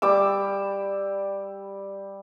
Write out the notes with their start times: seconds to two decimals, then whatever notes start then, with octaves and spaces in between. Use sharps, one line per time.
0.02 G3 D6 E6